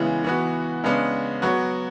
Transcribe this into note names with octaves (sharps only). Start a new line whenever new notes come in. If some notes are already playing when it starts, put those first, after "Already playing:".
Already playing: C#3 E3 G#3 B3
E3 B3 F#4
C#3 G#3 B3 D4
F#3 B3 F#4